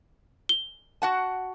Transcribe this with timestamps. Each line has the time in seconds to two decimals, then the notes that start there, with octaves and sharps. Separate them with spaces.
0.49 G7
1.02 F#4 F#5 A5